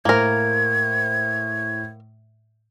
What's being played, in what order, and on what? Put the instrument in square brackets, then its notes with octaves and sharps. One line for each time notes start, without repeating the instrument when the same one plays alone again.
[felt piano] A2 C5 [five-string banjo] A#3 A#4 [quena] G#6